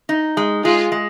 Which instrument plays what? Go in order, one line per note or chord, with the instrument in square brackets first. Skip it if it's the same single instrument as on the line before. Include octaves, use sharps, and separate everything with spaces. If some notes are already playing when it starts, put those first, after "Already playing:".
[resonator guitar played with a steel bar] D#4
G#3
[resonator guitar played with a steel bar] G#3 [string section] F4 G#4
[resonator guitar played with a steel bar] G#3